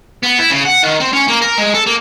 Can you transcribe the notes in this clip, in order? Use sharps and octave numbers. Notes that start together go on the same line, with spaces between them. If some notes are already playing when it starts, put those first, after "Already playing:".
B3
E4
C#3
F#5
D#3
C4
C#4
A#3
A#4
G#3
A4
A#3